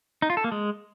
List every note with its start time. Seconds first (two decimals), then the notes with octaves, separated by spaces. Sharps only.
0.22 D#4
0.30 F4
0.37 A4
0.44 A#3
0.52 G#3